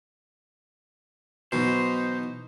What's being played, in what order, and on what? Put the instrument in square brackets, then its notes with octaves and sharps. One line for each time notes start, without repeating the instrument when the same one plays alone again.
[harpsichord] B2 [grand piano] E3 F#3 [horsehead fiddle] D#4 [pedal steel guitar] C5